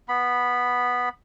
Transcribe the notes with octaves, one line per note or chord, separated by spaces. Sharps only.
B3 B5